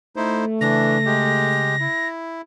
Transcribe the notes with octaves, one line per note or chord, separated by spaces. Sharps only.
A3 D#4 E4 C5
C#3 E3 D4 A#6
G#3 G4
E4